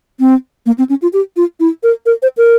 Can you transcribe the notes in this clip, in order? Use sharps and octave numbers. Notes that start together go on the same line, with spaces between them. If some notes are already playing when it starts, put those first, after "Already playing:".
C4
A#3
C4
C#4
F4
G4
F4
E4
A#4
A#4
C5
A#4